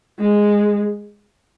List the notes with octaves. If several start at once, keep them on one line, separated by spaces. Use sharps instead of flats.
G#3